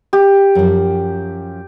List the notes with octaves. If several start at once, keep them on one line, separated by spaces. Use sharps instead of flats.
G4
F#2 F3